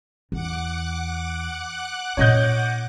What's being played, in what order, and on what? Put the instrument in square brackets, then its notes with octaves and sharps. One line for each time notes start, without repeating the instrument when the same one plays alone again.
[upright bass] E2 [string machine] F#5 D6 F#6
[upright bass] A#2 C#4 [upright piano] C#5 D#5 G6